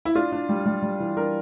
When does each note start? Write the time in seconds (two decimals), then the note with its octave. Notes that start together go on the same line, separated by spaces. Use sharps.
0.05 E4
0.15 D4 F4
0.32 D4
0.49 G3
0.66 G3
0.83 G3
1.00 E3
1.17 D4 A#4